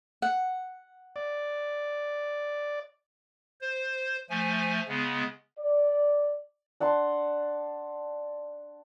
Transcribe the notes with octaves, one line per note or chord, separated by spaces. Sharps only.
F#5
D5
C5
F3 A3 G#5
C#3 G#3 B3
D5
D4 F#5 A5 C6